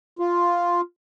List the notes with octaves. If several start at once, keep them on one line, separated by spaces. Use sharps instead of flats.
F4